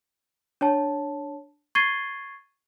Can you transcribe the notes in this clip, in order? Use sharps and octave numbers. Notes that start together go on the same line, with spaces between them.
D4 C#5 A5
C#6 G#6 A6 C7 D#7 G7